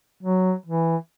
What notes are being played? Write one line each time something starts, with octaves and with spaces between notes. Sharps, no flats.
F#3
E3